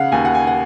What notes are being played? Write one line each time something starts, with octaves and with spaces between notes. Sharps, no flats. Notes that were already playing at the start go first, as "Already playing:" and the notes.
Already playing: C#3 F5 F#5
D#2 G#5
F#5
G#5
F#5